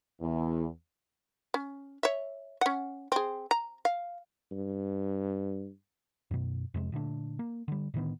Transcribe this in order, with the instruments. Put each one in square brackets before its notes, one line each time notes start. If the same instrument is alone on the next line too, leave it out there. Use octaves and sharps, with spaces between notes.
[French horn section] E2
[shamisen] C#4
C#5 E5
C#4 F#5
C4 G#4
A#5
F5
[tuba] G2
[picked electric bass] F#2 B2
F2 C3 G#3
A#2 D3 A3 D4
A#3
D3 G3
A2 D3 D#3 B3